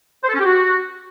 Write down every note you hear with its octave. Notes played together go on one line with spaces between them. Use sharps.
C5
A4
C#4
G4
F#4